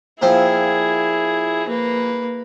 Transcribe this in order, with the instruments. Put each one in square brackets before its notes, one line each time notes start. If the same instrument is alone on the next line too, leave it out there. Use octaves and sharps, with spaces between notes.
[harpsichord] A#2 F3 C4 [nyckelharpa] E4 G#4
[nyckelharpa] A#3 B4